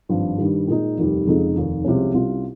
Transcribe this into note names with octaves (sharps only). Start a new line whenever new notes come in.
G#1 G2 F3
G2 D#3 G3
A#2 G#3 D#4
F1 D#2 D#3 G3
F1 F2 C#3 G#3 D#4
F1 D#2 D#3
C2 C3 F3 G#3 C#4
C2 C3 G3 C#4 F4